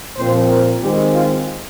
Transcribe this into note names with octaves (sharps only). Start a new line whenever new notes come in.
A#2 F3 C4 C5
A#4
D#3 G#3 C4 G4
F4